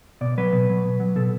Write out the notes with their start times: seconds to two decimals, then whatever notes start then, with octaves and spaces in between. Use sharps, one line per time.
0.21 B2 D5
0.38 F#3 B4
0.53 B2
0.70 F#3
0.85 B2
1.00 F#3
1.16 B2 A4